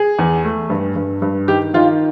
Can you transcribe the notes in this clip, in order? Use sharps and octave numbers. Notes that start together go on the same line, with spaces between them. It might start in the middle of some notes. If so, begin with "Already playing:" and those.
Already playing: G#4
E2
A3
G2
G2
G2
D#3 G4
D#3 F4